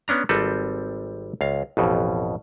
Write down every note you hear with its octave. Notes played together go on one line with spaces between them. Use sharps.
B3 C#4 D4 A#5
G#1 G3 C4 A4 B4
C#2 F5
A1 F2 B2